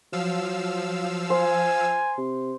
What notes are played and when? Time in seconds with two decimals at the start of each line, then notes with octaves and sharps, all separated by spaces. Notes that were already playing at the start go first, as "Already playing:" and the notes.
0.13 F3 F#3 F5 E6
1.30 C5 G#5
2.18 C3